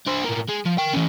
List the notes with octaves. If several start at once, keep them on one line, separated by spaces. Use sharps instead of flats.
D4 C5
A2 A#3
G#3
F3
A#4 G5
E3 C#4